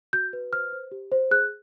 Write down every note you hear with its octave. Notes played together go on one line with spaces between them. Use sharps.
F#4 G6
B4
C5 F6
C5
G4
C5
G#4 F#6